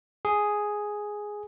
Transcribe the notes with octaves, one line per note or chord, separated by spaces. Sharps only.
G#4